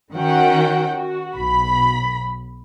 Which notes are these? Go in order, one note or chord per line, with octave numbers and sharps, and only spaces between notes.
D#3 C#4 F#4 F#5 G5
F#4
B1 B5